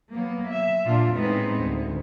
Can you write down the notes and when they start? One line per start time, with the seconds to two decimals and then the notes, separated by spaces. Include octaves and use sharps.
0.12 F#3 A#3 B3
0.47 E5
0.85 A#2 D4 F4
1.15 A2 G#3 B3 C4 D#4
1.63 D2